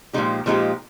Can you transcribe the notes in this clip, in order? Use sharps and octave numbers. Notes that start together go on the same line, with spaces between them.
A#2 F3 G#3 D#4 G4
A#2 F3 G#3 D#4 G4